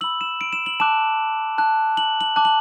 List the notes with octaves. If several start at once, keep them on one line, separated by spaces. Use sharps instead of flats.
B5 E6 F#7
E7
D7
E7
F#7
A5 D6 F#6 E7
A5 F#6
F#7
F#7
A5 D6 F#6
F#7